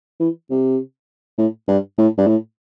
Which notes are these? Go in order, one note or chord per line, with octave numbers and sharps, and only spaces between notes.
E3
C3
A2
G2
A2
G2
A2